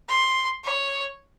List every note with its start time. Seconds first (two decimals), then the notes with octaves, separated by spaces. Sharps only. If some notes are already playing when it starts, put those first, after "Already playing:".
0.09 C6
0.64 C#5